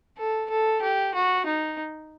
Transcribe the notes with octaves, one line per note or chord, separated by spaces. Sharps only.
A4
A4
G4
F#4
D#4